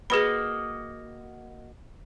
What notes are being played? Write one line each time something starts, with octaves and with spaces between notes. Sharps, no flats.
A#3 F#4 G#4 B4 D#5 B5